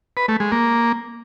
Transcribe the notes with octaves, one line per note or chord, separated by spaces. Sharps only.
B4
A3
G#3
A#3